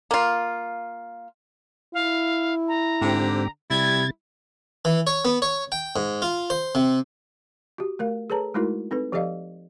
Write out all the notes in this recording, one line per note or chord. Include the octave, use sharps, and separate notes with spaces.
A#3 F4
E4 F5
A#5
G#2 D3 C4 G4
C3 G3 E4 G#6 A6
E3
C#5
B3
C#5
G5
G#2
F4
C5
C3
F#4 G4
A3 A#4 F5
G#4 A4 B4 C#5 A5 A#5
G#3 A3 D#4 E4 F#4 A#4
C4 D#4 A4 B4
F3 G4 A4 D5 D#5 F5